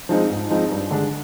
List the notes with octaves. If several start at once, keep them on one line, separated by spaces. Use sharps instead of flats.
F3 G#3 C4 D#4
G#2
F3 G#3 C4 D#4
G2
D3 G#3 D4